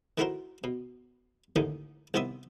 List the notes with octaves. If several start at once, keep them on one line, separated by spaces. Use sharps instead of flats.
D#3 A3 E4 F#4 A#4 C5
B2
A1 D#2 D3 D#3 A3 D#6
C2 D#3 B3 C5 E5 D#6